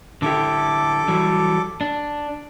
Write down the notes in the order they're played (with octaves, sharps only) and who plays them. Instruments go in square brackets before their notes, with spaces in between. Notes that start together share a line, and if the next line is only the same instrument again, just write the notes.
[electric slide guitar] D3 E4 G4 [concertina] A4 D6
[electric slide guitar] E3 F#3 G3
D4